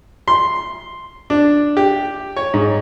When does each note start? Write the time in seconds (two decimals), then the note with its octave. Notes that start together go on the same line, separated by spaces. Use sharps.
0.28 C6
1.30 D4
1.77 G4
2.37 C#5
2.54 G#2